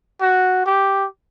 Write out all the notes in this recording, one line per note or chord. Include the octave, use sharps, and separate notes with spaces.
F#4
G4